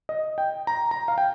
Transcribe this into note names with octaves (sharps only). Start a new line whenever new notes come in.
D#5
G5
A#5
A#5
F5
G5